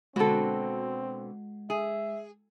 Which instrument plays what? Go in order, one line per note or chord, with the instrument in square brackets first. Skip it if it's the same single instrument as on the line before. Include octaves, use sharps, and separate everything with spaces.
[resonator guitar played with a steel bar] B2 D3 [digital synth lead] G#3 [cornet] C4 [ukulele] F#4 A4
[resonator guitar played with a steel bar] G#4 [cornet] E5